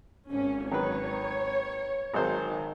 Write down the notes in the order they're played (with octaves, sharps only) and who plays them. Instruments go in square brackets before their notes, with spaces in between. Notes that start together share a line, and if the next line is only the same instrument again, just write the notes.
[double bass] G#1 [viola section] C#4
[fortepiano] D#3 F#3 B4 [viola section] C#5
[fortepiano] G#1 F#3 C5 [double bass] D#3